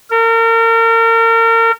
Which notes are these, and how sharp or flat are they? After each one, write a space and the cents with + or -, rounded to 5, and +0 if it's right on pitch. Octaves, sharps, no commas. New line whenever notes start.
A#4 -35